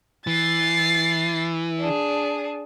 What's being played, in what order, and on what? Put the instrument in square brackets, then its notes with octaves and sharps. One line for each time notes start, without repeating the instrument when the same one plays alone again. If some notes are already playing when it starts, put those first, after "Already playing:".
[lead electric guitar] E3 [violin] A6 C7
[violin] D4 G#4